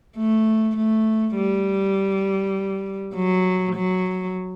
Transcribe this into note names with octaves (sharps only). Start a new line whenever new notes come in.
A3
A3
G3
F#3
F#3